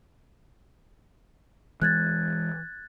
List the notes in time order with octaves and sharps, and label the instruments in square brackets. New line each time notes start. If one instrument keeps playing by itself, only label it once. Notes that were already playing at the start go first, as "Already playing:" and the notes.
[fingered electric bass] E3 G#3 [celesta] F#6 G#6 A6